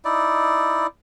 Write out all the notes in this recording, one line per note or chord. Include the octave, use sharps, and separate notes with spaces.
D#4 E4 D5